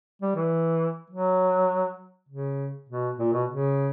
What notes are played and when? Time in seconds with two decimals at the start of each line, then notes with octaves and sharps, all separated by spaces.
0.22 G3
0.36 E3
1.10 F#3
2.29 C#3
2.89 B2
3.19 A#2
3.33 B2
3.49 C#3